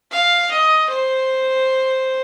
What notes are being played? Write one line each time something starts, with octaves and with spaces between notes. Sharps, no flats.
F5
D#5
C5